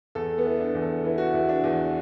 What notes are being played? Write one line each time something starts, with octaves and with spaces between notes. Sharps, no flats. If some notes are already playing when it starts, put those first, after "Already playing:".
E2 A4
B3
E3
D4
E2
A4
E3 E4
F#4
E2 E4
D4
E2